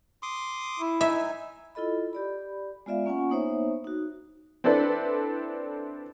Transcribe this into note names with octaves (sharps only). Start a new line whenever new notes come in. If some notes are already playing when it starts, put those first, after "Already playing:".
C6 D6 D#6
E4
D#4 E5 G#5
E4 F4 A4 D#5 B5
G4 D5 B5
G#3 B3 F4 D5 E5 F5
A#3 C#4 F4 F#5 G#5 C#6
A#3 B3 D#4 C5 C#5 E5
D#4 F#4
C4 D4 E4 A4 B4 D5